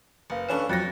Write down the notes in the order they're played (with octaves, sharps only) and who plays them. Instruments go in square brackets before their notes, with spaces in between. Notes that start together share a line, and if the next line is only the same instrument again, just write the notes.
[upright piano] F#1 [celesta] B4 F5
[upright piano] E3 C#4 D4 [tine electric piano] A4 B4 F5 [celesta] E7
[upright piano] F2 A#6 [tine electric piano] F3 F#3 [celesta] F#6 A6 C#7